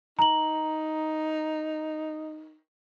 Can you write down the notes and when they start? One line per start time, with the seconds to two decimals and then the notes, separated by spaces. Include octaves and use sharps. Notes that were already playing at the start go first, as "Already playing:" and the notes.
0.19 D#4 A#5 F#7